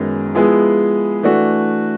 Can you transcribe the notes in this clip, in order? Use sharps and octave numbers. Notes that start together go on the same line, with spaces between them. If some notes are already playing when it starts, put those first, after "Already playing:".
Already playing: F#2 D#3 G#3 B3
F3 G#3 B3 E4 G#4
E3 A3 D4 F#4